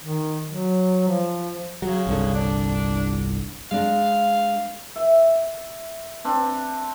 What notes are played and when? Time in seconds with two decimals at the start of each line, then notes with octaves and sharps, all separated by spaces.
0.04 D#3
0.47 F#3
1.08 F3
1.82 C#3 F#3
2.07 G1 C2 D3
2.34 D4
3.71 G#3 D4 F5
4.96 E5
6.24 C4 D4